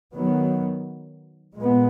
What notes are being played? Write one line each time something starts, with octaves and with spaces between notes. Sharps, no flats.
D#3 F#3 B3
A#2 G#3 B3